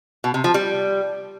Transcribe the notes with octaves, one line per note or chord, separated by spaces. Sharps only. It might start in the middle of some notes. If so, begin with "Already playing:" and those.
B2
C3
F3
G3